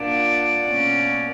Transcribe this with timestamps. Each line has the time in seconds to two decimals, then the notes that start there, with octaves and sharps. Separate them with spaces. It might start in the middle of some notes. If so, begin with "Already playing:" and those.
Already playing: A#2 A#3 D4 D5 F#5
0.62 B2 A#3 C#4